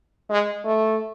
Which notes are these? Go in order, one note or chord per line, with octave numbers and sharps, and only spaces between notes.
G#3
A3